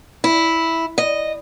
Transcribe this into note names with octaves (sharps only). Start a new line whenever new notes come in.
E4
D#5